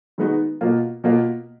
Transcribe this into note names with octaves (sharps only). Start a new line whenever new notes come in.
D#3 G#3 B3 D#4 F#4
B2 A#3 F4
B2 A#3 F4